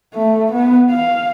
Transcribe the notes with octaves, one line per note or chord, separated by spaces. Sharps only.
A3
B3
F5